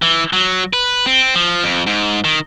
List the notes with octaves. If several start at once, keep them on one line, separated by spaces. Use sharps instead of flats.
E3
F#3
B4
C4
F3
F2
G#2
D#3